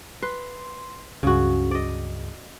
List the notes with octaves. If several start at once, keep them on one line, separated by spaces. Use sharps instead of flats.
B4 C6
C#2 G2 C#3 F#4 G#4
D5 D#5